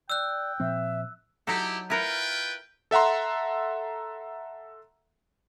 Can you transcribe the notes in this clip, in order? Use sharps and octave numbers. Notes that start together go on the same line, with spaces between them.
D5 G5 E6 F#6
A#2 F3 C4 E5
F#3 D#4 E4 G4 A4
E4 F4 A#4 B4 F#5 G5
A4 E5 F#5 A#5 C6